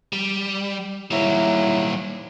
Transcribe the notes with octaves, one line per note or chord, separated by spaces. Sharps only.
G3
G#2 F#3 G3 A#3 E4